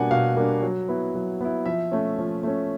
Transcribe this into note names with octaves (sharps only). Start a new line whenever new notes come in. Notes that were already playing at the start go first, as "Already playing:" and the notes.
Already playing: B2 G3 A#3 D4 F#5 G#5
B2 F5
G3 A#3 D4
F#3
B3 E4
F#3
B3 E4
F3 E5
A3 C#4
F3
A3 C#4